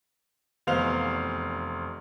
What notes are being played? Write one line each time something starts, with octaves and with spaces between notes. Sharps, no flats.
F1 E2 C5 F5 F7